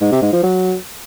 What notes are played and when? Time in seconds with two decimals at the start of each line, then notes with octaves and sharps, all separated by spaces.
0.01 G#2
0.11 C3
0.22 G#2
0.33 F3
0.43 F#3